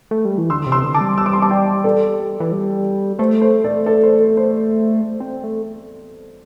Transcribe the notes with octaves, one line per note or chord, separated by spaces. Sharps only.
A3
G3
E3
D3 C6 E6
C3
C6 E6
D3
A5 D6
G3
E6
D6
C6
A5 D6
D5 G5
A4 D5
E3
G3
A3 C5
C5
A4 D5
A4 D5
C5
A4
C5
C4
A3